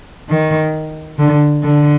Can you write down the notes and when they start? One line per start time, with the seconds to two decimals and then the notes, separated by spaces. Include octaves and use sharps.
0.29 D#3
1.18 D3
1.63 D3